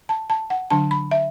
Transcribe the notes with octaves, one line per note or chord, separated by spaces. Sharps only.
A5
A5
F#5
D3 F#3 D4 A5
B5
E5